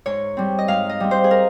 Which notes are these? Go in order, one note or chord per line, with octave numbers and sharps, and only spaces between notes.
G#2 C#5
G3 C4
D#5
G#2 F5
D#5
G3 C4
C5
G#4
A#4